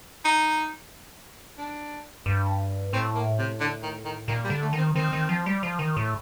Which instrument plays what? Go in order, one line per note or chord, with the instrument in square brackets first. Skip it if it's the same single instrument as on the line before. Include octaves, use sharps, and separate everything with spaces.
[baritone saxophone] D#4
D4
[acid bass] G2
[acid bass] A2 [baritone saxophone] C4
[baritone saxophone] A#3
C3
D3
D#3
D#3
[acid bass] A#2 [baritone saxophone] D#3
[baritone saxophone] G3
[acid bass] D3
[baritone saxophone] A3
[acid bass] D#3
[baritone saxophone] C4
[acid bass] D#3 [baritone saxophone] C4
[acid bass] D#3
F3
G3
F3
D#3
A2